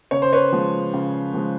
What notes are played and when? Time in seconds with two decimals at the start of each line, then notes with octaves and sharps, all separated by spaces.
0.11 C#3 C#5
0.22 C5
0.33 B4 C#5
0.53 F3 G#3
0.94 C#3
1.34 F3 G#3